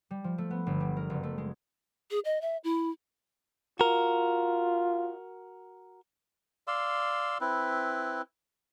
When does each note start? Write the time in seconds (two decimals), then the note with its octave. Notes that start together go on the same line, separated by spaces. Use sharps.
0.11 G3
0.24 F3
0.38 A3
0.51 B3
0.67 G1
0.80 G3
0.97 A#4
1.10 F#1
1.23 A3
1.38 G#3
2.11 G#4
2.25 D#5
2.41 E5
2.64 E4
3.80 F4 F#4 A#4
6.67 D5 F5 C6 E6
7.41 C4 E4 B4